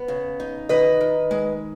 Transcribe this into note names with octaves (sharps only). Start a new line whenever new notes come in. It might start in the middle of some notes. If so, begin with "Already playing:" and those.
Already playing: B3
C#3
D#4
D#3 B4 D#5
D#3
G#3